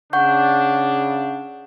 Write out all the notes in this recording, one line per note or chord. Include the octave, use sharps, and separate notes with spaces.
C#3 D4 F#5 C#6 G6